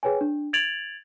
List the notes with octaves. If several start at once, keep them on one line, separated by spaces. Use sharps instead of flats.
G#4 B4 C#5 G5 G#5
D4
G#6 A6 D7 F7 F#7